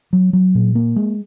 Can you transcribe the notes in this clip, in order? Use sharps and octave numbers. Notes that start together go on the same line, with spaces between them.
F#3
F#3
A#2
A#3
G#3